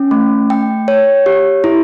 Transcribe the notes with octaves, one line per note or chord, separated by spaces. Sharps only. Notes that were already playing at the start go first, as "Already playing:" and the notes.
Already playing: C#4
A3
G5
C#5
G4
E4